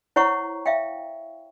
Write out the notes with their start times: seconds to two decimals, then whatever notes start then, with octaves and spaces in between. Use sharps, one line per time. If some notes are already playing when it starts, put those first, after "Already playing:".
0.16 E4 C5 C#5 F#5 A#5 C#6
0.66 E5 F5 G5